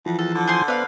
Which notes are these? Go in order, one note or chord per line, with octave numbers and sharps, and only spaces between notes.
F2 E3 F3
E2 A4
D3
G#4 C5 C6
B3 B4 C5 D5 F5